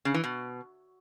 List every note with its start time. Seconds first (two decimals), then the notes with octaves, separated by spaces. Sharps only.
0.05 C#3
0.14 E3
0.24 B2